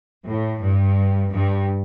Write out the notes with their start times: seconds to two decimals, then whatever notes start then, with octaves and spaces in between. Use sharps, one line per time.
0.27 A2
0.62 G2
1.32 G2